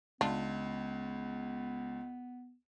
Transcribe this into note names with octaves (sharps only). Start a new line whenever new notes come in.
C#2 B3 D4 F4